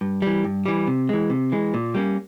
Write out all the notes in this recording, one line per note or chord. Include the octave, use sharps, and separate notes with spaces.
G2
E3 G3
G2
E3 G3
C3
E3 G#3
C3
E3 G#3
A#2
G3 A#3 C#4